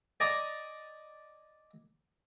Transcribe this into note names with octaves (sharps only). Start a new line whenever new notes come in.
D5 D#5 G#5 A#5 D6